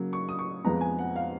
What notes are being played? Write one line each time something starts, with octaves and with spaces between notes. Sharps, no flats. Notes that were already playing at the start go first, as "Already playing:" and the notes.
Already playing: C#3 F#3 A#3
C#6
D#6
C#6
F2 F3 G#3 B3 A#5
G#5
F#5
F5